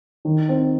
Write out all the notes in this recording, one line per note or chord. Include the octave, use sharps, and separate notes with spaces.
D#3
C4